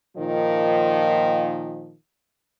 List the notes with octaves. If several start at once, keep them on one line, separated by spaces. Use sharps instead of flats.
A#2 D#3 F3